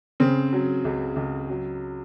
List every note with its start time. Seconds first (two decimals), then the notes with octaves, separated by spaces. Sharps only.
0.20 C#3 C4
0.53 F#3
0.85 C#2
1.16 C#2
1.49 F#3